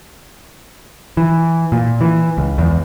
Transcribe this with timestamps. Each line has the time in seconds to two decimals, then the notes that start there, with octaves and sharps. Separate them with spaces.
1.17 E3
1.72 A#2
2.01 E3
2.37 C#2
2.58 E2